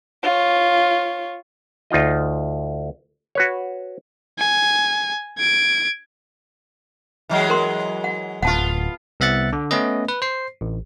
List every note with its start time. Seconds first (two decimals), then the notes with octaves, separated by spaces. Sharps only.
0.23 F4 C#5
1.91 D2 D#4 F4 D#5
3.35 F#4 B4 C#5
4.39 G#5
5.38 G#6 D7
7.29 E3 F#3 G#3
7.50 A#4 C6
8.04 F#5
8.43 D1 B3 F4 F#5 A5
9.20 C2 B3 E5 F#6 A6 C#7
9.53 D3
9.71 A3 B3 C#4 B4 D#5
10.09 B4
10.22 C5 C7
10.61 A1